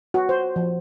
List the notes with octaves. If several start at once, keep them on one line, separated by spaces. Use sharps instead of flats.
F#4
C5
F3